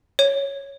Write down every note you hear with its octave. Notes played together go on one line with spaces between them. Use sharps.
C#5